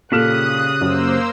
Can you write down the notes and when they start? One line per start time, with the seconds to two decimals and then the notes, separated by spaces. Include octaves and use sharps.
0.12 A#2 C#3 G4 A4 D#6 F6 F#6 E7
0.81 F#2 A#3 C5 E6